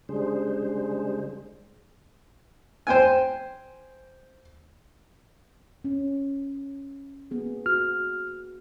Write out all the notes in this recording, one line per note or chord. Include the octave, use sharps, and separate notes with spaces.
C#3 G3 G#3 D4 G#4 C5
C5 G5 G#5
C#4
A#3 B3 G#4
F#4 F6